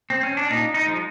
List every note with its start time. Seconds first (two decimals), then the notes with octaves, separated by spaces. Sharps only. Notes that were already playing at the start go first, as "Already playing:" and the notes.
0.10 C4
0.23 C#4
0.37 D4
0.50 A#2 D#4
0.74 D#4
0.86 F3 G#3